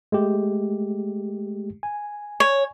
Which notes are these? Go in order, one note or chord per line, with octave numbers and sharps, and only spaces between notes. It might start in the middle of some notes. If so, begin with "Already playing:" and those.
G#3 A3 G4
G#5
C#5